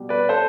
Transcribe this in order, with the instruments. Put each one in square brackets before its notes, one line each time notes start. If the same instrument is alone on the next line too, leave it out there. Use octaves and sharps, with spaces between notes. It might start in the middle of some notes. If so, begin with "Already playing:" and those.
Already playing: [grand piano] B2 G3
B4 D5
A4 C5